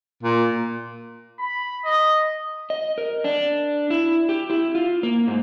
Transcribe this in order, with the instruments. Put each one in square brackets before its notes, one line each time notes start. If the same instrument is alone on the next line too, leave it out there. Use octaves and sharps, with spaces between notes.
[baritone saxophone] A#2
[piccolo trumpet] B5
D#5
[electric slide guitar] D#5
A#4
D4
E4
G4
E4
F4
A#3
G#2